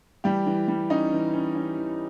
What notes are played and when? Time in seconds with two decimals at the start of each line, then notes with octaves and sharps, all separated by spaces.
0.24 E3 G3 G4
0.46 E3
0.68 G3
0.90 C#4 D#4
1.13 E3
1.34 C#4
1.55 C#4
1.78 E3